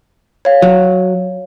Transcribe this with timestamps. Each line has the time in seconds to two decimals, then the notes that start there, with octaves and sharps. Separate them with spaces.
0.45 C#5 F5
0.62 F#3